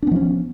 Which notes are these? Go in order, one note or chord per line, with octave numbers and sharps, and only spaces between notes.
F3 B3 C#4 D4